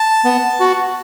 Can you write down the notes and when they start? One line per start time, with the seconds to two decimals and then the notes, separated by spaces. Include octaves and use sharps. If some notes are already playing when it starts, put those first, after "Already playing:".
Already playing: A5
0.25 B3
0.60 F#4